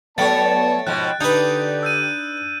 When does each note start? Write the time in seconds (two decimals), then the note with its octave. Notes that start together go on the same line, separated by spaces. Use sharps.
0.18 F#3 A3 B3 C#5 D5 A5 A6 D7
0.87 G#2 B2 F3 G5 F#6
1.21 D3 D4 D#4 G4 B4 G6
1.83 E6 G6 D#7